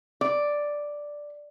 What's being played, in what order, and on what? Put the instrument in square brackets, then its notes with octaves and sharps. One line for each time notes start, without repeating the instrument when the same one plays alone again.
[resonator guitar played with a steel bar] D5